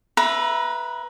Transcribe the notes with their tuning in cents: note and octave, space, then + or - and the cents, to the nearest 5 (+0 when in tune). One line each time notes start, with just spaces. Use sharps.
B4 -5 E5 +10 A#5 +25